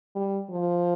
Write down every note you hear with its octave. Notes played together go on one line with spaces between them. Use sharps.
G3
F3